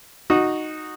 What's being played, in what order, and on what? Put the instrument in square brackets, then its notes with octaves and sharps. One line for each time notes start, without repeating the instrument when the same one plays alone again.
[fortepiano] D#4 F#4